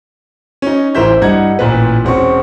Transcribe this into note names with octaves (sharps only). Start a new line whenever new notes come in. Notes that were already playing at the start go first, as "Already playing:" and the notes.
C#4 D#4
A1 E3 A#4 C5 E5 G6
G2 E4 D#5 F#5 A#5 G#6
A1 A#2 E4 B4
E1 C4 C#4 C#6